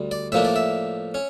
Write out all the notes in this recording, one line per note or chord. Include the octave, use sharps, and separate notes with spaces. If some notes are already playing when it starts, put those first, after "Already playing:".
Already playing: D2 G3
D5
A2 F3 A#3 D4 E5
D5
E5
C#4